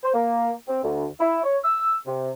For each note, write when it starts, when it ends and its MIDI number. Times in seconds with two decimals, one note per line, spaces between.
0.03 0.12 72
0.14 0.51 58
0.68 0.80 60
0.83 1.06 38
1.20 1.44 64
1.44 1.57 73
1.64 1.96 88
2.06 2.31 48